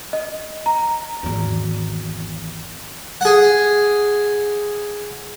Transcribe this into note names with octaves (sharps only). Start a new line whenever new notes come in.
D#5
A#5
G#1 E2
G#4 F#5